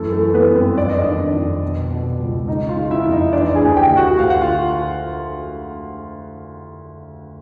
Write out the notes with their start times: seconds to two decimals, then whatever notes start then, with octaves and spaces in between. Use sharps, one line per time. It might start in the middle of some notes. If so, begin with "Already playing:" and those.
Already playing: F#2 E3 A3 A4
0.12 A3 A4
0.21 E3
0.34 B3 B4
0.48 G2
0.55 C4 C5
0.78 F2 D5
0.89 D#5
1.02 D#3 D4 D5
1.34 F2
1.62 B2
1.90 B2
2.19 C#2
2.48 C#3 D#4 D#5
2.69 F4 F5
2.76 C#3
2.91 E4 E5
3.05 F2
3.12 D#4 D#5
3.33 E3 D4 D5
3.55 G#4 G#5
3.61 D2
3.76 G4 G5
3.90 D2
3.97 F#4 F#5
4.18 D2 F5
4.30 F#5
4.41 F4 F5